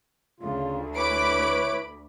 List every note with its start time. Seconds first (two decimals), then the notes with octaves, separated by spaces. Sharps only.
0.40 D2 C#3 F4
0.95 E4 B4 C#5 B5 D6 D7